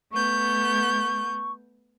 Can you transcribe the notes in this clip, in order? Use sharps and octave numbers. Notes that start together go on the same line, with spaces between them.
A3 B3 C#6 G6